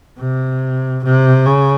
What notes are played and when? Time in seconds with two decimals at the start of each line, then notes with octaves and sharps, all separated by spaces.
0.19 C3
1.04 C3
1.46 C#3